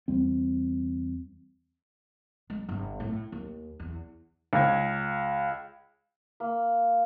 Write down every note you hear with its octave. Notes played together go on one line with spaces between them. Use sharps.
E2 G3 C4
G#3
G1
A2
D#2
E2
C#2 G#6
A#3